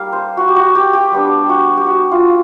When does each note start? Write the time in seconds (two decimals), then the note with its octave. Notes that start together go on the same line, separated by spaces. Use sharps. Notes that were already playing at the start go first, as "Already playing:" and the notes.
Already playing: G3 A#3 D#4 F5
0.13 C5
0.37 F#4
0.48 G4
0.56 F#4
0.75 G4
0.93 G4
1.12 G3 B3 D4
1.49 F#4
1.77 G4
1.86 F#4
2.12 F4